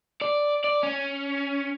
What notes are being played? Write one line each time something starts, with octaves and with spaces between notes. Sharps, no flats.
D5
D5
C#4